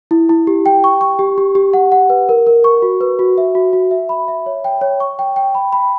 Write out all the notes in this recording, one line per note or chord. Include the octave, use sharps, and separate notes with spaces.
E4
E4
G4
G5
C#6
C#6
G4
G4
G4
F#5
F#5
B4
A#4
A#4
C#6
F#4
B4
F#4
E5
F#4
F#4
E5
B5
E5
C#5
G5
C#5
C#6
G5
G5
B5
B5